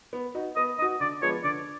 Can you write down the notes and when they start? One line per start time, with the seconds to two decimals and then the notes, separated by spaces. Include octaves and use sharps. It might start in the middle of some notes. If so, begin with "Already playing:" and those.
0.13 B3
0.35 D#4 F#4
0.56 B3 D#5
0.79 D#4 D#5
0.82 F#4
1.00 D3 D5
1.22 F3 G#3 B3 C#5
1.44 D3 D5